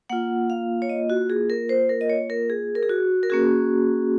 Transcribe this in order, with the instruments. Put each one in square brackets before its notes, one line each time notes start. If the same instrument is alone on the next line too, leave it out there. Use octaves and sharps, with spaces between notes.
[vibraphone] A#3 F4 F#5
F5
C#5
D#5
F#4
G#4
A#4
C5
A#4
D#5
C#5
A#4
G#4
A#4
G#4
F#4
A#4
A#3 C#4 F#4 G#4